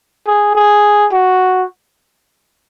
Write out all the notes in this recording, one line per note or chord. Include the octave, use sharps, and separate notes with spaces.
G#4
G#4
F#4